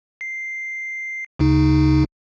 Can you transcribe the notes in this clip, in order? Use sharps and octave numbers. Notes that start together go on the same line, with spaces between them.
C7
D2 C#3 D#4